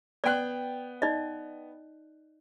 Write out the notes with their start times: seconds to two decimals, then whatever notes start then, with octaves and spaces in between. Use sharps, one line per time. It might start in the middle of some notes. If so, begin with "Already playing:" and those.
0.24 B3 D5 F#5 G5 F#6
1.02 D#4 D5 D#5